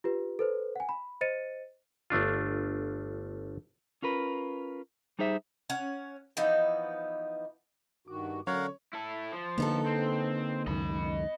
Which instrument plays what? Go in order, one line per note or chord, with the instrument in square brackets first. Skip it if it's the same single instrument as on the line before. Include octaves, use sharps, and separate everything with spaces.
[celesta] F4 G4 B4
A4 B4 C5
F#5 G#5
B5
C5 D#5 A6 C#7 D#7
[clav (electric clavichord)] G1 A3 D4 F4
[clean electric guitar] C#4 F4 A#4 B4
G3 D#4 G#4 C5 E5
[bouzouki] C#4 F#5
E3 F3 B3 D#4
[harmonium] G2 D#3 F#4 [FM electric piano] D6
[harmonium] D3 [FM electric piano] F#3 C#4 [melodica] A#4 F5 F#5 [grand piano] C#5
[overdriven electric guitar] E4 A4
F3
[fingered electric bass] D3 A#3 [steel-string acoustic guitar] B3 D#4 A4
[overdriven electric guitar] C4
[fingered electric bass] C#2 F#2 D#3 [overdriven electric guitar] D#5 B5